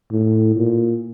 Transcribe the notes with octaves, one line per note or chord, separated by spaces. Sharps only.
A2
A#2